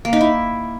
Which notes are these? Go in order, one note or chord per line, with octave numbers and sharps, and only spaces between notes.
A#3
D#4
E4